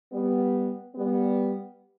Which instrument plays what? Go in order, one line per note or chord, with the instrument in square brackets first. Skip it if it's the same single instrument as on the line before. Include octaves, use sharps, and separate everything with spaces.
[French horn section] G3 B3
G3 B3